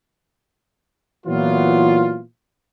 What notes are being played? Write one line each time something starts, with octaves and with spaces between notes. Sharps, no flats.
A#2 E3 F#3 B3 E4 F4